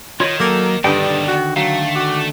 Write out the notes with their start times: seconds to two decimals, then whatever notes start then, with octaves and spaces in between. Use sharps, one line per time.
0.20 D#3 F4 C#5 D#5
0.40 F#3 A#3 A4
0.84 G2 B2 D3 D#3 A4 D5 G5 D#6
1.28 F#4
1.56 F#3 A3 F5
1.96 F#4 D6